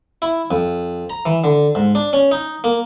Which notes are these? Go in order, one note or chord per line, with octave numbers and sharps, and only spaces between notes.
E4
F2
A#5
E3
D3
G#2
D4
C#4
D#4
A#3